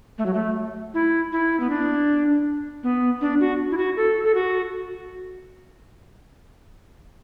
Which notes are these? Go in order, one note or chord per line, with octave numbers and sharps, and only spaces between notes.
A3
F#3
A3
E4
E4
B3
D4
B3
D4
F#4
E4
F#4
A4
A4
F#4